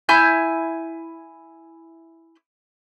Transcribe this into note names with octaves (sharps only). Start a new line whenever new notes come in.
E4 G#5 G6